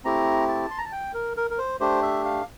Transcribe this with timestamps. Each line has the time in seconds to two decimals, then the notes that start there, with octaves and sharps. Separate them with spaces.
0.04 A3 C4 E4 G4 A#5
0.48 A5
0.71 C6
0.78 A#5
0.85 A5
0.92 G5
1.14 A#4
1.37 A#4
1.51 A#4
1.58 C5
1.80 A3 D4 G4 C5
2.02 E5
2.25 F5